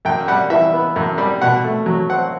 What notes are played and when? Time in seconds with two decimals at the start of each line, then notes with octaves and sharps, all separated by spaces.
0.05 F#2 G5
0.28 G3 F#5
0.50 E3 E5
0.73 B3
0.96 F#2
1.18 G3
1.42 B2 F#5
1.64 A3
1.86 F#3
2.10 C4 F#5